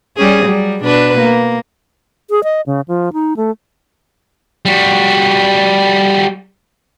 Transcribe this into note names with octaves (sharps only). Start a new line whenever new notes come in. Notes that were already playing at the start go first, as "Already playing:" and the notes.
G3 C#4 G#4
F#3 G3
B2 D4 B4
A#3
G#4
D#5
C#3
F3
D#4
A3
G3 F#4